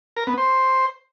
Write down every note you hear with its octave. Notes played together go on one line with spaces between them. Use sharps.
A#4
B3
C5